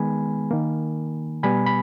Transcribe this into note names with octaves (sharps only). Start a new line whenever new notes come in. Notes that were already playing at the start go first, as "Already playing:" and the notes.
Already playing: D#3 G#3 B3 G#5 B5
D#3 A#3
B2 G3 B3 G#5 B5
B5